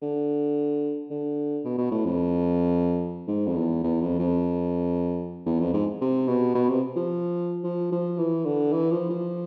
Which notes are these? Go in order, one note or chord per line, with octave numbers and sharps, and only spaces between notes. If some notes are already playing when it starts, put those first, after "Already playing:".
D3
D3
B2
B2
A2
F2
G#2
F2
E2
E2
F2
F2
E2
F2
G#2
C3
B2
B2
C3
F3
F3
F3
E3
D3
E3
F3
F3